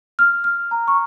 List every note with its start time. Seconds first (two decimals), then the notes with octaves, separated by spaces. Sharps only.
0.19 F6
0.44 F6
0.71 A#5
0.88 C#6